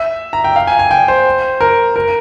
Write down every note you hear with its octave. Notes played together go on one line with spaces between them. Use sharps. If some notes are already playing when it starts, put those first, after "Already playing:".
Already playing: E5
A#5
G5
F5
G#5
G#5
G5
C5
A#4
A#4